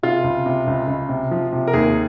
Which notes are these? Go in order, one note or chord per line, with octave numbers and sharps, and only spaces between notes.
C3 F4
C#2
C3
C#2
C#2
C3
F3
C3
A#4
D#2 G#4